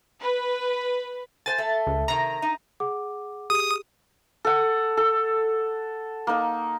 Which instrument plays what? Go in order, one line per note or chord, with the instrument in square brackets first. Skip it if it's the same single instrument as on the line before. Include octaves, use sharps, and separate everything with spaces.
[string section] B4
[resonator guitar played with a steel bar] C5 G#5 [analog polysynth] A6
[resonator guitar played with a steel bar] A3
[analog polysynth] C#2
[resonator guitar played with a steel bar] C3 D#3 [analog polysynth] A#5
[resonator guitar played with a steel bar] D#4
[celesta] G#4 F#5 D6
[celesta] G4 G#4 [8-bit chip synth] D#6
[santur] A4 F#5
A4
A#3 D#4